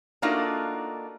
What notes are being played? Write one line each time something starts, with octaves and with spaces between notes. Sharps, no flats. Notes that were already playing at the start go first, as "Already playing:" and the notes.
A3 A#3 D4 D#4 F4 F#4